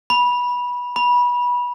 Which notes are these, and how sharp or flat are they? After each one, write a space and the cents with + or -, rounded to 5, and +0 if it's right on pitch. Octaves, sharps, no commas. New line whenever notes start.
B5 -15
B5 -20